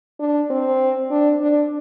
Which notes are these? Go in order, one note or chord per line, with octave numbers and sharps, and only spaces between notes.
D4
C4
D4
D4